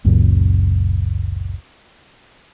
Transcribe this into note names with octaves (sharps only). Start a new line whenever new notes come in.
F#1 C#2 F#2 A#2